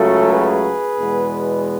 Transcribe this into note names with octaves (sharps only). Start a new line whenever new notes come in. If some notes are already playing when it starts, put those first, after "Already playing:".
Already playing: C#2 C#3 F#3 A3 F#4 A4
G#4 B4
E2 B2 G#3 B3